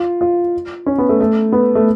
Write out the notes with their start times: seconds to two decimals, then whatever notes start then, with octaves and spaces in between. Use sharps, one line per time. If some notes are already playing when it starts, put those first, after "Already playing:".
Already playing: F4
0.21 F4
0.86 C#4
0.98 B3
1.09 A3
1.21 A3
1.52 B3
1.75 A3